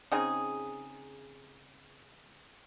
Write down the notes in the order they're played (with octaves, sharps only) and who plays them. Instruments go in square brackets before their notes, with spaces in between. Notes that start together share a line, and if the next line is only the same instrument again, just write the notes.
[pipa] C#3 C4 D#4 G#4